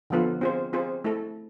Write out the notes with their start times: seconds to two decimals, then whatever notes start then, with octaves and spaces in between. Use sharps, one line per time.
0.10 D3 F3 B3 F4 A4
0.41 C4 F4 G#4 C5
0.73 C4 F4 G#4 C5
1.04 A3 E4 A4